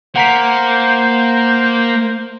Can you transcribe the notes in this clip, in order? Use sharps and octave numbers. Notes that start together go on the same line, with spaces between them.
A#3 C5 F#5 A#5 B6